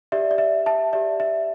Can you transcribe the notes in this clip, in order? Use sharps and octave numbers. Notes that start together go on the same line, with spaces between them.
G4 D5 E5
D5
E5
E5 A5
G4 D5 E5
E5